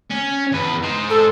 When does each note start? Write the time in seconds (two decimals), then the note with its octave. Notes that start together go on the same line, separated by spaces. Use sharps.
0.10 C#4
0.52 E2 B4
0.83 D#4 C5
1.10 A4